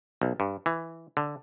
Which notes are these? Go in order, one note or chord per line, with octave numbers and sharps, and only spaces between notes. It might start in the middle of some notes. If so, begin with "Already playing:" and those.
B1
G2
E3
D3